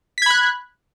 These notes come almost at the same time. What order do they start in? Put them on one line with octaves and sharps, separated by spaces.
B6 G#6 B5 F#6